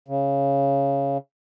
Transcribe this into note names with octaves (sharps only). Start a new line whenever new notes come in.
C#3